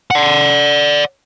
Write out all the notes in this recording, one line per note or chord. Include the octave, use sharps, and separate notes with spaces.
D5 F#5